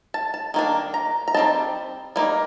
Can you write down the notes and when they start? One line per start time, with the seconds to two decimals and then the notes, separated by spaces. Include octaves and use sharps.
0.14 A5
0.34 A5
0.54 D#3 A#3 D4
0.94 A#5
1.28 A#5
1.34 G3 C4 D#4 A5
2.16 G3 A#3 D#4